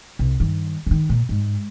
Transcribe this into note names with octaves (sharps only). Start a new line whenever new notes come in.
C2
G2 D#3
D3 D#3
A#2
G#2